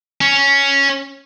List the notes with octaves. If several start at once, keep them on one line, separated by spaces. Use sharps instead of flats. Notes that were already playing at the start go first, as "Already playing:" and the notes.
C#4